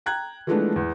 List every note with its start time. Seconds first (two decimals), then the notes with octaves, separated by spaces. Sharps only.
0.06 G5 A#5 F#6 G#6
0.47 E3 F3 G#3 A3 B3 D4
0.76 E2